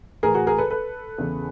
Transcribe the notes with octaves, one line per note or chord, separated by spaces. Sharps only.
A2 E3 G#4 A#4
F#4 G#4
G#4 A#4
A4 B4
A4 B4
E2 C#3 E3